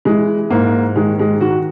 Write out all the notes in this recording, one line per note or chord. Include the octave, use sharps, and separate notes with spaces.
E3 G#3
G#2 A#3
D#3 G#3
G#3
D#3 F#4